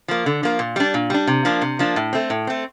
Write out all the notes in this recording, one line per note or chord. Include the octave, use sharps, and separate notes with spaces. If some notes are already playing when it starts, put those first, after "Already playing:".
F3 A#3
D3
F3 A#3
A#2
G3 D4
A#2
G3 D4
C3
F3 A#3 D4
C3
F3 A#3 D4
A2
A3 C4
A2
A3 C4